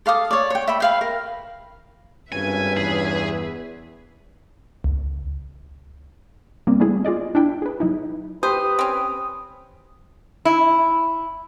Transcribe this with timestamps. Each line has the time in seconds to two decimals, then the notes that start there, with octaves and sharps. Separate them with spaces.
0.06 A4 F5 D6 D#6
0.31 C#5 D5
0.50 C#5 G5
0.68 E5 G5 B5
0.80 B4 F5 G5
1.01 A#4
2.32 G#1 G2 C#4 B4 E5 G#5
2.77 E2 G#4
4.84 C#2
6.67 G3 A#3 C4
6.80 G3 A3 B3 E4 G#4
7.05 F4 G#4 D5 D#5
7.35 D4 E4 G5
7.62 G#4 B4
7.80 F#3 D#4 E4
8.43 G4 B4 C5 D#6
8.79 C4 C#4
10.45 E4